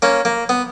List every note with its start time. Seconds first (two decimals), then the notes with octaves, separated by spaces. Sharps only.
0.02 A#3 C#4
0.25 A#3
0.49 B3